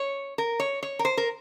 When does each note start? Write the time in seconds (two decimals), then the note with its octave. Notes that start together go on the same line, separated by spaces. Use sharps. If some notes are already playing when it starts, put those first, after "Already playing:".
Already playing: C#5
0.38 A#4
0.60 C#5
0.83 C#5
0.99 A#4
1.05 C5
1.17 A#4